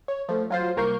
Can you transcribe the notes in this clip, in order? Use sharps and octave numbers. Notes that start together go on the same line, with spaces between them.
C#5
F3 A3
F#3 F4 C5
C2 A#3 A#4 C#6 G6 C7